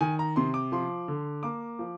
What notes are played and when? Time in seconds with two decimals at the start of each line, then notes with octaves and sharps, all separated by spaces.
0.01 D#3 G#5
0.19 A#5
0.36 C3 C6
0.54 D6
0.72 F3 C6
1.08 D3
1.43 A#3 D6
1.79 F3